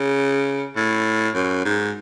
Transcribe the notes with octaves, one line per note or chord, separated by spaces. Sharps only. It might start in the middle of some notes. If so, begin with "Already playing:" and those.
Already playing: C#3
A2
F#2
G#2